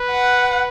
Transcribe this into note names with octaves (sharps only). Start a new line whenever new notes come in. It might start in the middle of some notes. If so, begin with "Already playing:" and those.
Already playing: B4
F#5